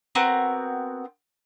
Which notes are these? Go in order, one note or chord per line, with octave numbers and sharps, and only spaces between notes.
B3 C4 F#4 A#4